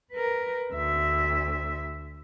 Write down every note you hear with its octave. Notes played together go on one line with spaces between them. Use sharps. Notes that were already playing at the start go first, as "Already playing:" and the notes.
A#4 B4
D2 E5